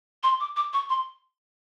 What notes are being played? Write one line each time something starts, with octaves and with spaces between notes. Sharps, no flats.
C6
D6
D6
C#6
C6